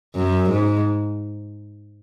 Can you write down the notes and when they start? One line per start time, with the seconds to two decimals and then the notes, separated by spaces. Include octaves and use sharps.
0.16 F#2
0.49 G#2